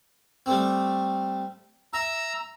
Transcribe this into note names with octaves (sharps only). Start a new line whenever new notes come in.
G3 A3 C4
E5 A#5 E6